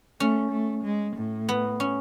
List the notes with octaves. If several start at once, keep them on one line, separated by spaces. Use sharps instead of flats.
A3 C#4
A3
G#3
A2
B3
C#4